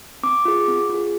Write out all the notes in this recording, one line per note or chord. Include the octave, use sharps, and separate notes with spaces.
C4 D6
F4 G#4
C4
F4 G#4